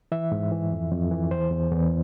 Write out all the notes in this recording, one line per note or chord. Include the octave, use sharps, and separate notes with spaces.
E3 E5
G#2
E3
F2
F2
E3
E2 C5
E2
E2